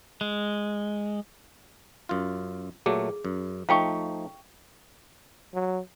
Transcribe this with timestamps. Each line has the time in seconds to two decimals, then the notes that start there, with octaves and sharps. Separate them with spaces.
0.21 G#3
2.09 F#2 F4
2.86 A#2 F#3 A3 G#4
3.25 F#2
3.69 F3 A3 D#4 F5 G5 C#6
5.54 F#3